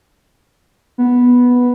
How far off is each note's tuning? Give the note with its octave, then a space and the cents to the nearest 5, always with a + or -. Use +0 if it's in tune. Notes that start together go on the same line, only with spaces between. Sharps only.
B3 -5